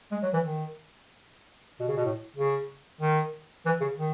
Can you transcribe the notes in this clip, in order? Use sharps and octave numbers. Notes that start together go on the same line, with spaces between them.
G#3
F#3
E3
D#3
B2
C#3
B2
A2
C#3
D#3
E3
C#3
D#3